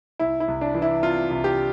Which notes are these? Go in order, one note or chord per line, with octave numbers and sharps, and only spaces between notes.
C2 E4
E4
C2
D4
E3
E4
C3 F4
C2
G4